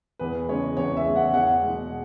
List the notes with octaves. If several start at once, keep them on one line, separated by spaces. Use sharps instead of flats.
E2 B4
C#3 G#3 C#5
E2 C#5
E5
C#3 G#3
F#5
E2 F#5
B2 G#3